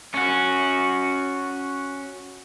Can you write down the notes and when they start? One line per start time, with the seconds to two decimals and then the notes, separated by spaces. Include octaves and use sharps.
0.14 C#4 F#4